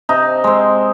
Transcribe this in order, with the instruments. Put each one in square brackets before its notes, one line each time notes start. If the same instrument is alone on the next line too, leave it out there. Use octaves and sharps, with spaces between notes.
[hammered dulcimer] C3 D#4
G#3 C4